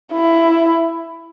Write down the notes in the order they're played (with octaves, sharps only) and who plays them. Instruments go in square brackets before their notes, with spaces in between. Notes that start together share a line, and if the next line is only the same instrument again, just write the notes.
[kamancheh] E4